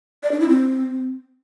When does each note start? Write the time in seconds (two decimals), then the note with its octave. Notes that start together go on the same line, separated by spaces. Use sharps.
0.23 D5
0.32 D4
0.40 E4
0.49 C4